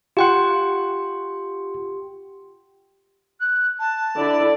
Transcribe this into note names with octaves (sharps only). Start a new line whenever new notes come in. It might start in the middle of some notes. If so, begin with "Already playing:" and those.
F4 G4 F#5 G5 C6
F#6
A5
D3 E4 D5